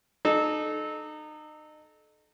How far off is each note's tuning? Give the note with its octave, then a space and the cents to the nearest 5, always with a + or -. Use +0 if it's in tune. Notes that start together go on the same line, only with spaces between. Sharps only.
D#4 -30 A4 -25